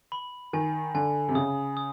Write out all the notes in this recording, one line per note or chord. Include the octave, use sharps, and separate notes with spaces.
B5
D#3 G#5
D3 G#5
C3
C#3 D#6
D#6